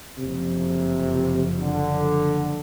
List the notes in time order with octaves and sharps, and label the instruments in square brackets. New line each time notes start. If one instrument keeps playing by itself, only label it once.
[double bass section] F#1 F2 F3 [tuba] C3
[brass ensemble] D3